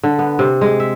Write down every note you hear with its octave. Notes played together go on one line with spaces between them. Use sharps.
D3
B3
C3
G#3
E5